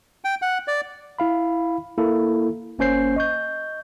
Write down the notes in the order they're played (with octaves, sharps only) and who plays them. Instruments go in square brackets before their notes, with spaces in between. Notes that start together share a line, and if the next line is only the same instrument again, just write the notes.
[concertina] G5
F#5
D5
[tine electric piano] E4 F5 B5
A#3 E4 A4
G1 A#3 C#4 C5 G6 C7
D#5 C#6 G6